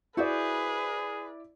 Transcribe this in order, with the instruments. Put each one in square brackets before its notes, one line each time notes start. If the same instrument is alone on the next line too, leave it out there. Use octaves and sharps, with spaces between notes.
[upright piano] E4 D5 [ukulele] F#4 C5 E5 [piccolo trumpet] G#4 [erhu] B4